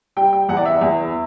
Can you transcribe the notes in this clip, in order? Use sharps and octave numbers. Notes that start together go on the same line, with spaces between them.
G3 G5
G5
E2 F#5
D5
E5
E2